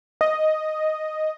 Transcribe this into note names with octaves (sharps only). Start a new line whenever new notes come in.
D#5